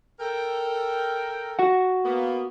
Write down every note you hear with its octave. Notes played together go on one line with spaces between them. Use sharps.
A4 A#4 G5
F#4 F#5
A#3 B3